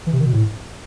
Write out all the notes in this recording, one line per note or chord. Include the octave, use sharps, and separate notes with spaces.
E3
C3
D#3
B2
A2